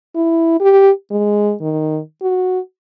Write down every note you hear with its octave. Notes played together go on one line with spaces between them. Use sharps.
E4
G4
G#3
D#3
F#4